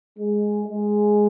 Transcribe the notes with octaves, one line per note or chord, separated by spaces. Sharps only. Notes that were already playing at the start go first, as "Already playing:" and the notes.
G#3
G#3